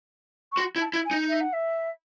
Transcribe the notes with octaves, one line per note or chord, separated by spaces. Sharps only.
C#6
F#4 C6
E4
A5
E4
G#5
D#4
E5
F#5
E5